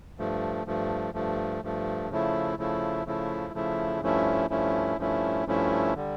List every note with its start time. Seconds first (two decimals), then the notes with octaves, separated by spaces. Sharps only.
0.18 G2 F3 A3
0.66 G2 F3 A3
1.14 G2 F3 A3
1.63 G2 F3 A3
2.10 C#3 F3 A3 E4
2.57 C#3 F3 A3 E4
3.06 C#3 F3 A3 E4
3.54 C#3 F3 A3 E4
4.02 G2 F3 A3 C#4 E4
4.50 G2 F3 A3 C#4 E4
4.98 G2 F3 A3 C#4 E4
5.46 G2 F3 A3 C#4 E4
5.96 D3 G3